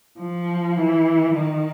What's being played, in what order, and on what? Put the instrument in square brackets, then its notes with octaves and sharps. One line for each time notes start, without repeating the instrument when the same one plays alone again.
[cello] F3
E3
D#3